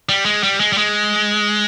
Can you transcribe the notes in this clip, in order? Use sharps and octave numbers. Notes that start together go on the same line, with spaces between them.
G3
G#3
G3
G#3
G3
G#3